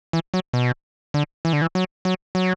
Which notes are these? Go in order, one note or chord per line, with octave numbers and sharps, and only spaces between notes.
E3
F#3
B2
D3
E3
D3
E3
F#3
F#3
F#3